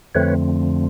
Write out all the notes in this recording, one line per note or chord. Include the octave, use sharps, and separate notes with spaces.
F2 D3 F3 A3 C4 B4 C#5